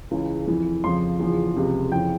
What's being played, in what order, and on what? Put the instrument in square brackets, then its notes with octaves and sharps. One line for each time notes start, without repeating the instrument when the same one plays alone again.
[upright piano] C#2 C#3 E3
F2 E3
F2 C#3 F3 C6
E2 C#3 F3
C#2 C3 F3
F2 C#3 E3 G5